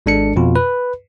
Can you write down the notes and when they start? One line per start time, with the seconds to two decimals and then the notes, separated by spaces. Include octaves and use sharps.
0.06 G#1 G#3 D4 A4 C#7
0.36 F2 B2 F4
0.56 B4